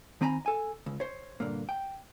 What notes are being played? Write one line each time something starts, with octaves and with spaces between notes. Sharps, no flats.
D#3 C4 G#5 A#5 B5
A4 G#5
C#2
C5 C#5
G2 A#2 D3 A#3
G5